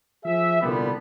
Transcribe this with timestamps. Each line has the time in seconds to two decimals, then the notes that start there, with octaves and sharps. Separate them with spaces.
0.24 F3 G#4 E5
0.61 C2 A#2 D3 G3 B3